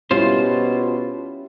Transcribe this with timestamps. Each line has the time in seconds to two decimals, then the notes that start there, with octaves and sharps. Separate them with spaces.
0.11 B2 G3 C#4 E4 F4 C5